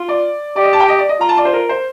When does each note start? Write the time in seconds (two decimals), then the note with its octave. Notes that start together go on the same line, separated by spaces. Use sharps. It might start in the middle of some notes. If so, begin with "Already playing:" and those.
Already playing: F4
0.08 D5
0.56 G4 D5
0.64 D#5
0.73 A5
0.80 G5
0.88 D#5
0.99 D5
1.09 D#5
1.20 F4 A#5
1.29 A5
1.37 D5
1.45 C5
1.53 A#4
1.69 C5